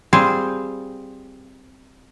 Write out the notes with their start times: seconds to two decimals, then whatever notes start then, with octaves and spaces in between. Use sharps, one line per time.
0.13 G3 C4 F4 G#4